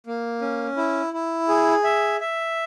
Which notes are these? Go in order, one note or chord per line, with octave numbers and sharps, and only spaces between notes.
A#3
C#4
E4
E4
G#4
E5
E5